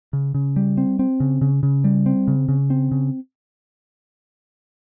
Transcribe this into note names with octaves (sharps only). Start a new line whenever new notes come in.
C#3
C#3
G3
C4
C4
C#3
C#3
C#3
G3
C4
C#3
C#3
C4
C#3